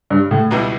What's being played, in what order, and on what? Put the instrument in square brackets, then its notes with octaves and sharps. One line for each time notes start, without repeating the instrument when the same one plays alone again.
[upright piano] G2
A2
[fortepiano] C#2 B2 G3 B3 E4